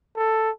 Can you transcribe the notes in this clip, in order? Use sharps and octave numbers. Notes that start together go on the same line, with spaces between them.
A4